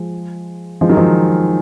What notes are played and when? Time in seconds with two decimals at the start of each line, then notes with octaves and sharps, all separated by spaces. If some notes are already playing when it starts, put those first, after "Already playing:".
Already playing: F3 G#3
0.81 F3 G#3
0.89 D#3 F#3
0.97 F3 G#3